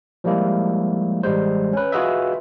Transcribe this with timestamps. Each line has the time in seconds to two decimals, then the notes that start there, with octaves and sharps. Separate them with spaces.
0.24 F3 G3 G#3 A#3 E4
1.23 A1 G3 G#3 C5
1.73 C#4 B4
1.92 F4 F#4 G#4 B4 D#5 E5